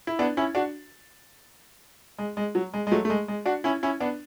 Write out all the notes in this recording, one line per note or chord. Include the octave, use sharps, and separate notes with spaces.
E4
B3 D4
C#4 E4
D4 F#4
G#3
G#3
F#3
G#3
G#3
F#3 A3
A3
G#3
G#3
D4 F#4
C#4 E4
C#4 E4
B3 D4